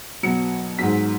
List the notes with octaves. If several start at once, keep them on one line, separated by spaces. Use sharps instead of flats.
B2 F#3 C#7
G#2 F#3 B6